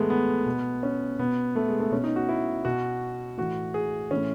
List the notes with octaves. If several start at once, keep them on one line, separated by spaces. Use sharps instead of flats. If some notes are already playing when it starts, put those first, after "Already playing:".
Already playing: A2 E3 G#3 A3 B3
B3
B2
C#4
B2 B3
A3
G#3
A3
B2 C#4
D#4
F#4
E4
B2 F#4
A2 E3 F#4
G#4
A2 E3 C#4